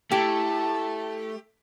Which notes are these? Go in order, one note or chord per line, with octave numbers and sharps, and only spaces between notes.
A3 E4 G4 G5 A5